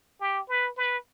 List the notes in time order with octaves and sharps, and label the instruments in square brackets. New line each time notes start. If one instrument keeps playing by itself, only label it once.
[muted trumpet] G4
B4
B4